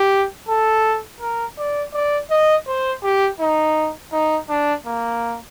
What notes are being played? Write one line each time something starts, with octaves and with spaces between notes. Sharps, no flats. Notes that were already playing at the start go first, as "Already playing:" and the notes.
Already playing: G4
A4
A#4
D5
D5
D#5
C5
G4
D#4
D#4
D4
A#3